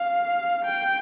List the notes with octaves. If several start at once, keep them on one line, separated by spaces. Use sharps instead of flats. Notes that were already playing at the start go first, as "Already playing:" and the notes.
Already playing: F5
G5